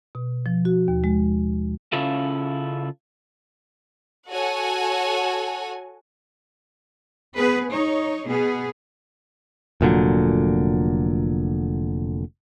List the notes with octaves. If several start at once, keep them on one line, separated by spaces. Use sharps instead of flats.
B2
F3
F#4
D#2
G#3
C#3 C#4 E4 F4 A4
F#4 A4 C#5 F#5 G#5
B3 G#4 B4
D#4 C#5
B2 B3 G#4
F1 A#2 D3 F#3